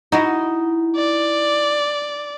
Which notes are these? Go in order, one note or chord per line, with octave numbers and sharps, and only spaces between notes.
D#4 E4 F#4 D#5
D5